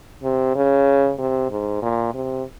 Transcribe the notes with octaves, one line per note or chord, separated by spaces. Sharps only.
C3
C#3
C3
G#2
A#2
C3